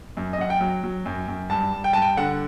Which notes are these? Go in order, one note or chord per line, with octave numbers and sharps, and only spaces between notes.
F#2
D#5
F#2 F#5
G5
F#3
F#3
F#2
F#2
G2 A5
G2
G5
G2 A5
G5
D3 F#5